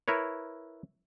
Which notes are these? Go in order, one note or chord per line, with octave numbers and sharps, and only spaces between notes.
E4 A#4 B4 C#5